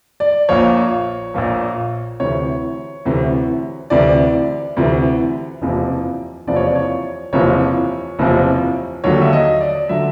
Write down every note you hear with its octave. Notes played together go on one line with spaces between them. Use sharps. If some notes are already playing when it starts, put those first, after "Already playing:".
D5
A#1 A#2 F3 C#5
A#1 A#2 F3
D2 C3 E3 C#5
D2 C3 E3
D2 C3 E3 D5
D2 C3 E3
F#1 E2 C3 F3
F#1 E2 C3 F3 D5
C#5
D5
C#5
F#1 E2 C3 F3 C#5
F#1 E2 C3 F3
D#2 D3 F#3 C#5
E5
D#5
D5
D3 F#3 E5